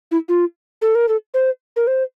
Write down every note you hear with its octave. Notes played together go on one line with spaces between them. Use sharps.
E4
F4
A4
A#4
A4
C5
A#4
C5